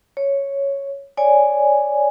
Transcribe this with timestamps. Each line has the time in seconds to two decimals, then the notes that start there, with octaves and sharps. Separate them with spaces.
0.17 C#5
1.17 C#5 D5 G#5